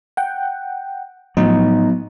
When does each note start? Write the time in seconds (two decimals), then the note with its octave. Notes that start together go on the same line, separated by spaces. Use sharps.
0.17 F#5 G5
1.37 A2 F3 F#3 B3 D#4